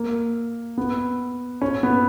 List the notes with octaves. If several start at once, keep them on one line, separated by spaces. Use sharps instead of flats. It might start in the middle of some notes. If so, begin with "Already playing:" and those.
Already playing: A#3
B3
C#4
B3